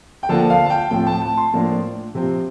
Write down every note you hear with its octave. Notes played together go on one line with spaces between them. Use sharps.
G5
D3 F3 A#3 D4 A5
F5
A5
G5
A2 F3 C4 G5
A5
A5
C6
A2 F3 A#3 D4
C3 F3 C4